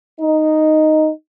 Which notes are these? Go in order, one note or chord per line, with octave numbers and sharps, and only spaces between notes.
D#4